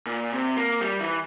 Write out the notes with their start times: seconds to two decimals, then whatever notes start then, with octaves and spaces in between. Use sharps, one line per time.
0.06 A#2
0.31 C3
0.57 A#3
0.81 G3
1.00 E3